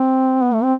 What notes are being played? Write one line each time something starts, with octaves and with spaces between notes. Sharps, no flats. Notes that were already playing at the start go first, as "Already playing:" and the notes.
Already playing: C4
B3
A3
C4